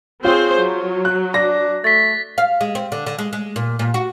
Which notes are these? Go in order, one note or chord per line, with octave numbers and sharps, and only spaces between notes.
C4 F4 G#4 C5 C#5
F#3
F#6
D4 A#6
A3 A6 B6
F5
G#3
C4
D3
D3
G#3
G#3
A#2
A#2
F#4